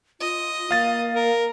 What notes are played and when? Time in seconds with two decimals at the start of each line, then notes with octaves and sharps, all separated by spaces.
0.20 F4 D#5
0.71 A#3 F5 A6
1.14 A#4